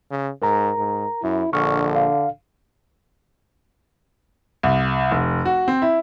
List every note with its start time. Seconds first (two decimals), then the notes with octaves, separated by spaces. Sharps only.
0.11 C#3
0.42 G#2 A#4 A#5
0.78 G#2
1.23 F#2 E4
1.53 A#1 D3 C#6 F6
1.96 F5
4.63 C2
5.11 F1
5.45 F#4
5.68 C4
5.82 E4